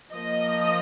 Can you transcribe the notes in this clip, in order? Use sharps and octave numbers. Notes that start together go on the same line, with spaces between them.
F3 A#3 D#5